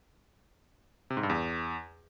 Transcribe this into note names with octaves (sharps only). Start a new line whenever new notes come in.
C3
G#2
G2
E2